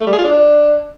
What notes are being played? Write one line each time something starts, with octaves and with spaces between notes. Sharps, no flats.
A3
G3
G#4
F4
D4